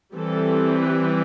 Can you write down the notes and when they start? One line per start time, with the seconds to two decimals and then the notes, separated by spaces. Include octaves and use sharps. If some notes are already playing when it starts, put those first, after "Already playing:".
0.15 E3 G3 C4 A4
0.81 B4